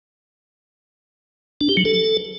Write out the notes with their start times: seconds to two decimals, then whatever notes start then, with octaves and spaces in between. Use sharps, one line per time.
1.61 D4
1.69 G4
1.77 F#3
1.85 A4